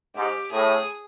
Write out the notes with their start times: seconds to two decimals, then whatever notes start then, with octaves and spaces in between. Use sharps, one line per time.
0.15 G#2 G4
0.52 A2 G#4